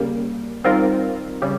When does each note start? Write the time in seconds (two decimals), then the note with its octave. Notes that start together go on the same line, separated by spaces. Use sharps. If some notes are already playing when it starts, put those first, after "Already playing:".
Already playing: C#3 G3 A#3
0.64 D#3 G3 C4 F4 A#4
1.42 C#3 G3